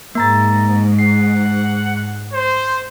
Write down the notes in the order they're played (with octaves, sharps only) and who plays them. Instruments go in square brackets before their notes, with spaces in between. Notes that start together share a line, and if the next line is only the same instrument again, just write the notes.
[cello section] G#2 [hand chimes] A#3 A#5 A6
[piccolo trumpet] F#5 [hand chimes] C7
[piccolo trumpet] C5